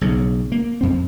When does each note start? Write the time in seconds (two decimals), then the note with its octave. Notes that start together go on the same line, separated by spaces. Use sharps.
0.01 B1 C#3
0.52 A#3
0.81 F2 C4